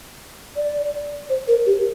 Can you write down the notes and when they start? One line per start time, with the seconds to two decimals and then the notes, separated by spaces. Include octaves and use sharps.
0.56 D5
1.29 C5
1.48 A#4
1.66 G4